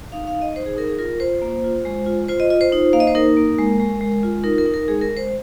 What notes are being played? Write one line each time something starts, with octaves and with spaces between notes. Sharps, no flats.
D#4 F5
F5
D#4
D#5
D#4 C5
G#4
D#4 A#4
G#4
F4 A#4
F4 C5
A#3
F4
G#3
F4
F4 C5
D#5
F4 D#5
C5
D#4
A#3 F5
D#5
C5
D#4 A#4
A#3
G#3
G#3
G#3
F4
D#4 A#4
A#4
D#4
A#4
G#3 G#4
A#4
G#3
C5